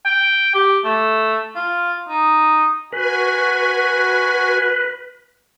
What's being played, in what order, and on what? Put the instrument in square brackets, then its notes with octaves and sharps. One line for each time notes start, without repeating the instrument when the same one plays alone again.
[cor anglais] G5
G4
A3
F4
D#4
[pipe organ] F#4 G#5 [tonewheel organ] B4